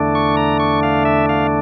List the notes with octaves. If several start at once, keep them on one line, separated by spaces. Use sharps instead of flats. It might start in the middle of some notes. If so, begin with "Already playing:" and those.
Already playing: E2 D3 A3 D4
C#6
A#5
C#6
F5
E5
F5